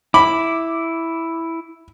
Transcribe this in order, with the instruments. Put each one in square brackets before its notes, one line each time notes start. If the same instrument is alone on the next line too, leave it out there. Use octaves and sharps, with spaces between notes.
[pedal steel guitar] E4 [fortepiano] B5 [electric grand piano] D6